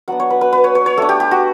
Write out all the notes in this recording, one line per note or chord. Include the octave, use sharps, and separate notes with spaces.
F#3 B3 D4 F#5
C#5
B4
B4
B4
C#5
C#5
C#5
A3 D4 A4
G4
G4
F#4